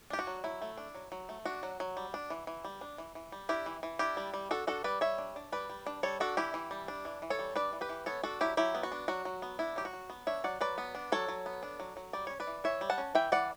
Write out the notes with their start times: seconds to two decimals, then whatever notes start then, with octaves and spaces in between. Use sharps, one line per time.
0.10 D4 G4
0.19 F#4
0.27 F#3
0.44 F#3 E4
0.62 A3
0.77 D4
0.95 F#3
1.12 F#3
1.29 A3
1.45 D4 F#4
1.63 F#3
1.80 F#3
1.97 G3
2.14 D4
2.30 E3
2.47 E3
2.65 G3
2.81 D4
2.98 E3
3.15 E3
3.32 G3
3.49 D4 E4 G4
3.66 E3
3.83 E3
3.99 D4 E4 G4
4.17 G3
4.34 G3
4.51 D4 F#4 A4
4.67 D4 F#4 A4
4.84 G3 B4 D5
5.01 G3 C#5 E5
5.18 D4
5.36 D4
5.52 G3 B4 D5
5.69 G3
5.86 D4
6.03 G3 A4 C#5
6.20 D4 F#4 A4
6.37 E3 E4 G4
6.54 E3
6.71 G3
6.88 D4
7.05 E3
7.22 E3
7.30 A4 C#5
7.39 G3
7.56 D4 B4 D5
7.73 E3
7.81 G4 B4
7.89 E3
8.06 B3 A4 C#5
8.23 D4 F#4 A4
8.41 F#3 E4 G4
8.57 F#3 E4 G4
8.75 B3
8.83 F#4
8.92 D4
9.08 F#3 F#4
9.25 F#3
9.42 B3
9.59 D4 E4
9.76 F#3 G4
9.85 F#4
9.93 F#3
10.10 B3
10.27 D4 C#5 E5
10.44 F#3 D5 F#5
10.61 F#3 B4 D5
10.78 B3
10.95 D4
11.12 F#3 A4 C#5
11.28 F#3
11.46 B3
11.63 D4
11.80 F#3
11.97 F#3
12.13 G3 D5
12.27 C#4 C#5
12.40 B4 D5
12.47 E3
12.64 E3 C#5 E5
12.81 G3
12.90 F#5 A5
12.98 C#4
13.15 E3 E5 G5
13.32 E3 D5 F#5